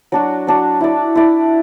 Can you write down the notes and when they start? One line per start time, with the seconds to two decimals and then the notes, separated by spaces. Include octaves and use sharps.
0.12 F#3 D4 F#4
0.47 F#3 D4 F#4
0.80 E4 D5
1.15 E4 D5